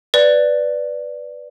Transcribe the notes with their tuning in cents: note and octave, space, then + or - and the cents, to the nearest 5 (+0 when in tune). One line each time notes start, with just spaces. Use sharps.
B4 +5 D5 +0